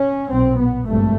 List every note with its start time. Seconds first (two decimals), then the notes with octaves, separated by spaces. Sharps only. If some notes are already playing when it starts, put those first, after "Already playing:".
Already playing: C#4
0.31 B1 A#2 C4
0.59 B3
0.88 G#1 G2 A3